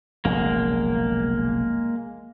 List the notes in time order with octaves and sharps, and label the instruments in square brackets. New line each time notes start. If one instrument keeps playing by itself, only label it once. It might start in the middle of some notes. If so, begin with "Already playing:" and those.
[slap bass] F1 B1 C#3 [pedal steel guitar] G#3 A#3